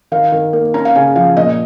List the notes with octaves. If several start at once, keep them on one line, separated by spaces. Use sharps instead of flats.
D#3 F5
D#3
A#3
C#4 A#5
F5
C#3 G#5
F3 F5
A#2 D#5